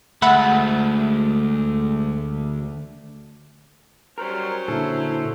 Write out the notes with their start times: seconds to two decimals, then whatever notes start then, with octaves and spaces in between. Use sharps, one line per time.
0.22 D2 G#3 A3 E5 F#5 B5
4.18 F#3 G3 C#4 A#4 C5
4.68 A#2 D3 E4 A4